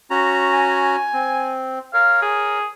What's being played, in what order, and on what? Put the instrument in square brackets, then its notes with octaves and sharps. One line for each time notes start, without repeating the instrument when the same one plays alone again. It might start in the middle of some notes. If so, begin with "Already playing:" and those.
[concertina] C#4 F#4 A#5
[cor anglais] G#5
[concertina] C4
[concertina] A#4 C#5 [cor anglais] F5
[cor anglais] G#4